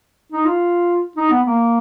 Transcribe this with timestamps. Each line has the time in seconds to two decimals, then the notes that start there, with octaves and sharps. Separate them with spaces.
0.32 D#4
0.45 F4
1.17 D#4
1.30 B3
1.45 A#3